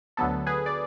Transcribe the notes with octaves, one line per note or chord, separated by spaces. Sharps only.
D2 D3 F#3 B3 A4
G#4 B4
D5